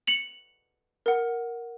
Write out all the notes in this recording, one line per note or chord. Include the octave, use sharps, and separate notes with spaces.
C#7 F7 F#7
A#4 F#5